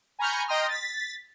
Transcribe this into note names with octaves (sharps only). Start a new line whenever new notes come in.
G#5 A#5 B5 C#6 F6 G6
D#5 G5 A#5 C6 D#6 F6
A6 B6